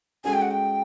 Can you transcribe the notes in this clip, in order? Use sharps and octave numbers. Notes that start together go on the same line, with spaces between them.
G#3 C#4 F#4 A4 G#5
G5
F#5
G5